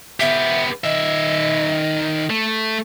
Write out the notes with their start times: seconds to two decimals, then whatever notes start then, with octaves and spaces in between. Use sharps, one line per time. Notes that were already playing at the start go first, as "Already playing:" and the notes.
0.20 B3 G4 E5
0.84 D#3 D#5 E5
2.30 A3